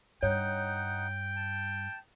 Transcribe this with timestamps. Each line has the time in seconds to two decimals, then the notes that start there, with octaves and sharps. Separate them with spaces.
0.23 G2 D#4 C#5 F#5 G5
1.36 A5